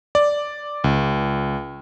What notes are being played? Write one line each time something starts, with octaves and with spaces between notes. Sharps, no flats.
D5
C#2